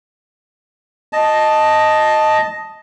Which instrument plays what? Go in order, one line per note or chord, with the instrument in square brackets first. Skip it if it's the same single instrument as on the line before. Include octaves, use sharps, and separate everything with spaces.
[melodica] D#5 A5